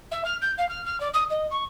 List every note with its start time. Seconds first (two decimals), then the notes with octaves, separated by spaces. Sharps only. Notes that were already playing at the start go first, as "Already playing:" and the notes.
0.11 E5
0.25 F6
0.42 G6
0.58 F5
0.69 F6
0.85 F6
1.00 D5
1.14 D#6
1.30 D#5
1.51 C#6